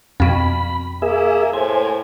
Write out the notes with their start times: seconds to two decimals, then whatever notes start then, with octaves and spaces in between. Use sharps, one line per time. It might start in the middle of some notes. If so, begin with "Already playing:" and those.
0.20 F2 B2 B5
1.02 A#3 G#4 E5
1.53 A2 C5 G#5